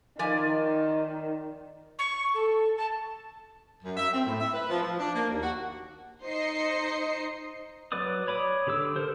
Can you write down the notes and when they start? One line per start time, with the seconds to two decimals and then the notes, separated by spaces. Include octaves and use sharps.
0.19 D#3 F3 D5 G#5
1.99 C#6
2.34 A4
2.77 A5
3.83 F#2
3.97 E5
4.13 C4
4.25 A2
4.40 E5
4.53 B4
4.70 F3
4.83 F3
5.00 D4
5.14 A#3
5.30 D#2
5.42 F#4
6.23 D#4 C5 D#5 C7 C#7
7.92 F#3 B4 D5 D6 D#6
8.27 C#5 B5 D6 D#6
8.67 D3 G4 D6 E6
8.96 A4 A#4 C5